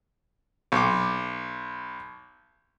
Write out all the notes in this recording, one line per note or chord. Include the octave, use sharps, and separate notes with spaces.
B1 D6